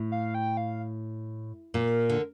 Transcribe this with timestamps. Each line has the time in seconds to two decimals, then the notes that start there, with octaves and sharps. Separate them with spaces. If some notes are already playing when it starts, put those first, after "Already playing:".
Already playing: A2
0.12 F5
0.34 G5
0.57 F5
1.74 A#2 A#4
2.09 D3